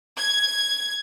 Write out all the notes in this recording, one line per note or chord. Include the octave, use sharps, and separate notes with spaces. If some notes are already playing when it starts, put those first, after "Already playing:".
G#6